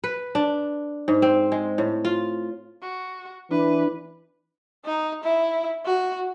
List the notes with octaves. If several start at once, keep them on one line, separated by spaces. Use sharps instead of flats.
B4
D4
G#2
C4
G#3
A2
F4
F#4
E3 D4 B4
D#4
E4
F#4